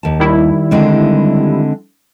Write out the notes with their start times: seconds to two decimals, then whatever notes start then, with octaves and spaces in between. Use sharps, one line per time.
0.03 D#2 A5
0.20 D#3 G3 E4
0.71 D3 G#3 C4